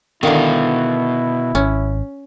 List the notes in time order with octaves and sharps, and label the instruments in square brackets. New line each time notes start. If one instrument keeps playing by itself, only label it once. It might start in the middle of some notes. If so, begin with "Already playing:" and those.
[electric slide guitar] B2 F5 [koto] D3 D#3 [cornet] E4
[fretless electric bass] G#1 [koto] C#4